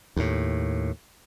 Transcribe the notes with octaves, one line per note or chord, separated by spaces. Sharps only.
D#2 A2